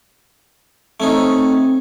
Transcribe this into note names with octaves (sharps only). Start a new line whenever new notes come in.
A3 C4 C#4 D#4